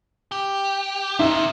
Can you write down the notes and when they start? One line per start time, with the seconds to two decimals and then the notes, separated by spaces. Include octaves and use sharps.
0.32 G4
1.19 C3 D#3 D#4 E5